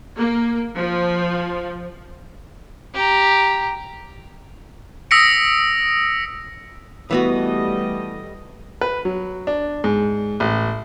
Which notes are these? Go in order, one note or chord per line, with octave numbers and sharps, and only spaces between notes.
A#3
F3
G4 A#5
D#6 E6 A#6 B6 C#7 D7
E3 G3 A3 B3 F#4 D#5
B4
F#3
D4
G#2
A1